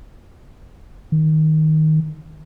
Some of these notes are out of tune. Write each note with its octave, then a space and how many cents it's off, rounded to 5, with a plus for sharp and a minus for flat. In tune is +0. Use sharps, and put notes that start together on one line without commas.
D#3 +5